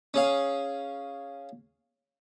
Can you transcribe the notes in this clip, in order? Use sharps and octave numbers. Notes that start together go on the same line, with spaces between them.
C#4 G#4 F5